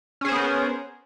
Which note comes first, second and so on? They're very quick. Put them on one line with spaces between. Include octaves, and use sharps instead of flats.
C#4 G#4 C5 B3 A#4